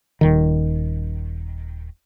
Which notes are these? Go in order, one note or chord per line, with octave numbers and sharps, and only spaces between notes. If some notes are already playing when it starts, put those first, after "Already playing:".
D#1 D#3